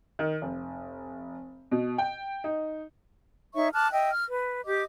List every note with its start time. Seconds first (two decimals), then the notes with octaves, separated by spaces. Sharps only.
0.19 D#3
0.42 F1
1.72 B2
1.98 G5
2.44 D#4
3.54 D#4 C#5 E5 C#6
3.74 A5 D6 F6 F#6
3.91 D#5 E5 G5
4.12 F6
4.28 B4
4.64 G4 D#5 D6